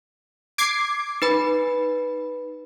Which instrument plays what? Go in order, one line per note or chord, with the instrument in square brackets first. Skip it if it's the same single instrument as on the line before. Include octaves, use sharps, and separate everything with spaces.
[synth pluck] D6 G#6 C7
[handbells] D#4 B4 B5